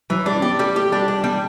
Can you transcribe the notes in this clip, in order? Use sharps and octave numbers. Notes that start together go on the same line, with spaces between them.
E3 F#3
G3 D4
C#4
B3 G4
G3 A3
A3 G4
G3 D4
G3 D4
G3 B3